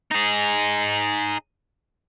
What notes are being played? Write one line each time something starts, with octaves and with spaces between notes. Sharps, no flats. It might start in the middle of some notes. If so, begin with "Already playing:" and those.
D#4 G#4